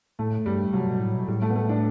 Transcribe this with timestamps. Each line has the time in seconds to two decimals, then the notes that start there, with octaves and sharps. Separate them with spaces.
0.19 A2 A3
0.46 G2 G3
0.73 C3 F#3
0.87 B2
1.00 A2
1.14 B2
1.28 A2 G3
1.42 A3
1.50 B3
1.56 A3
1.69 D4